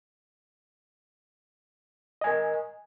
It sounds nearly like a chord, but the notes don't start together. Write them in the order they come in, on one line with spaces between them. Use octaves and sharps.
D#5 G#5 A#4